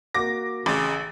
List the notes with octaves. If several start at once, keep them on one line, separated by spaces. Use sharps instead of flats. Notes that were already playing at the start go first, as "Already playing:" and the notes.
A#3 F#4 D6 A#6
A1 C#3 D6 A6